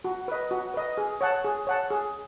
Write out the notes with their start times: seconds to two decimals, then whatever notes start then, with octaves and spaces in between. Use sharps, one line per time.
0.04 F#4
0.28 B4 D#5
0.51 F#4
0.74 B4 D#5
0.98 G#4
1.21 C#5 F#5 A5
1.44 G#4
1.67 C#5 F#5 A5
1.90 G#4